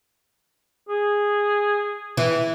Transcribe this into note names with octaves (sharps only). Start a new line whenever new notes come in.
G#4
E3